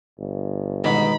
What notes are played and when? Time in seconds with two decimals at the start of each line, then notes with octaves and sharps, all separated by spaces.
0.19 G1
0.84 G#2 B2 D#3 B5